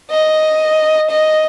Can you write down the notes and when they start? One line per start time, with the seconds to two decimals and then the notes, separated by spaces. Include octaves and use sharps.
0.11 D#5
1.11 D#5